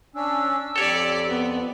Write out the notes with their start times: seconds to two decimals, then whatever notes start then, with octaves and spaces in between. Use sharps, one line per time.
0.15 C#4 D4 E6
0.76 F2 G4 A4 C#5 D5
1.27 B3